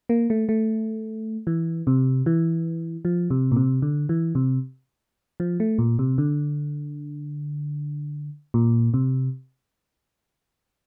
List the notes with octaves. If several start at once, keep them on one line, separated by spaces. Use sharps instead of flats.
A#3
A3
A3
E3
C3
E3
F3
C3
A#2
C3
D3
E3
C3
F3
A3
A#2
C3
D3
A#2
C3